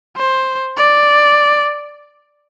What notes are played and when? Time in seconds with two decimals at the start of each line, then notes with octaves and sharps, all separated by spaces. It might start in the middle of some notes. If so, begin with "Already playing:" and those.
0.17 C5
0.78 D5